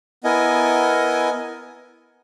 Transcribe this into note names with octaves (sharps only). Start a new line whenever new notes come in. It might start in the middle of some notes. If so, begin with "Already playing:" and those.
B3 E4 A#4 D#5 G#5